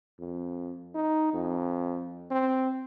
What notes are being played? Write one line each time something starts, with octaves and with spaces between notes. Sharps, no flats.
F2
D#4
F2
C4